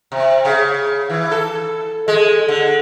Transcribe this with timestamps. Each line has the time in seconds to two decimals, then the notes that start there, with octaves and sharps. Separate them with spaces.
0.12 C3
0.45 C#3
1.10 E3
1.31 A4
2.08 G#3
2.49 D3